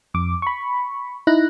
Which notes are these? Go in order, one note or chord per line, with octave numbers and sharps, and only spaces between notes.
F2 D6
B5 C#6
D#4 E4 F#6 A#6